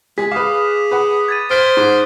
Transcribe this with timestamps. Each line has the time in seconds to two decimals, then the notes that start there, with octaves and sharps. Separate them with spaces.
0.18 G#3 G#4 B6
0.32 G#4 B4 F5 D6 D#6
0.91 B4 F#5
1.28 G#6 A6 D#7
1.50 C5 F6 G#6 A6 B6 D7
1.77 G#2